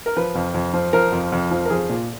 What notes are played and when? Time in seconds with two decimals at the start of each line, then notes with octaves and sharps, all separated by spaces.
0.06 A#4
0.17 F3 B4
0.35 F2
0.54 F2
0.74 F3
0.93 F3 A#4
1.12 F2
1.32 F2
1.51 F3
1.65 A#4
1.70 F3 G#4
1.89 A#2